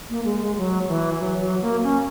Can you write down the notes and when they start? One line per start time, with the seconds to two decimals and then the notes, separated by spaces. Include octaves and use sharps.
0.10 A#3
0.25 G#3
0.41 G#3
0.57 F#3
0.88 E3
1.19 F#3
1.40 F#3
1.62 A#3
1.83 C#4